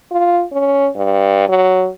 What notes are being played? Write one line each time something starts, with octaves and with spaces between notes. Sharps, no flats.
F4
C#4
G2
F#3